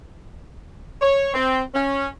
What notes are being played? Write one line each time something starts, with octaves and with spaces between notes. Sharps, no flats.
C#5
C4
C#4